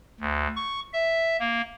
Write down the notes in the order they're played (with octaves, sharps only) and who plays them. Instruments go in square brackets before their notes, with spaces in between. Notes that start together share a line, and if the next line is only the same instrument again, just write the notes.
[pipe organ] D2
C#6
E5
A#3